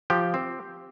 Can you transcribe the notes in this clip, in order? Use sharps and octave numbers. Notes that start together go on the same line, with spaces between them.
F3 G4 G5
C4